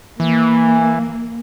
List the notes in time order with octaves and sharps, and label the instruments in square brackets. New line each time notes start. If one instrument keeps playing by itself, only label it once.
[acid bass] E3 [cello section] A#3